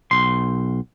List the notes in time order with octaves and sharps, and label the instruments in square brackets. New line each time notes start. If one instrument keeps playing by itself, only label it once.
[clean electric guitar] B1 C6